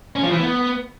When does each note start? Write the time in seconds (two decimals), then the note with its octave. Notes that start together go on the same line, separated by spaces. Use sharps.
0.16 C#4
0.24 F3
0.32 E3
0.40 B3